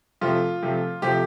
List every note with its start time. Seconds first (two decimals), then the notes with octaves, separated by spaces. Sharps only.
0.21 C3 F3 A3 F4
0.62 C3 F3 A3
1.02 C3 F3 A3 G4